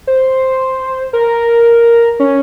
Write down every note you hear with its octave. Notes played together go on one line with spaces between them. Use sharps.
C5
A#4
C#4